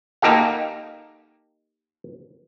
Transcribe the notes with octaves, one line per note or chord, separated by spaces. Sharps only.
A#3 D#4 G4 A4 F5